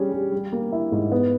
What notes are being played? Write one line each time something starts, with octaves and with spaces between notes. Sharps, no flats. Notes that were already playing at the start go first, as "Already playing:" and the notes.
Already playing: G3 C#4 G#4
G3
G3
A#3
E4
G#2
B3